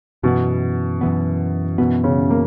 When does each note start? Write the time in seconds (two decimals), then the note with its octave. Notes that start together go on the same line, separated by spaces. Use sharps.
0.23 F#2 B2 E3 B3
1.01 F#2 E3 B3
1.78 F#2 B2 E3 B3
2.04 C#3
2.30 A#3